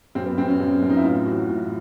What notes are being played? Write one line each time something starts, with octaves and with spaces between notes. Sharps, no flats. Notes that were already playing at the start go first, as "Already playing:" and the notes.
F#2 C4
B3
F#2 C4
C#4
F#2
F#2
D#4
E4
A2 F4
E3 F#4
A2